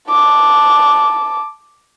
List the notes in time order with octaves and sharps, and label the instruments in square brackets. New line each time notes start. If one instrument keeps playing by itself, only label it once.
[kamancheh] A5 D6